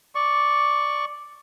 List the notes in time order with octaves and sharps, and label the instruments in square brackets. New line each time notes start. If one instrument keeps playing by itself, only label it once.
[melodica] D5 C#6